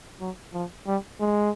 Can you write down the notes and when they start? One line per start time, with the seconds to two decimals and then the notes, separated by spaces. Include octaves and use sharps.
0.21 F#3
0.54 F3
0.87 G3
1.21 G#3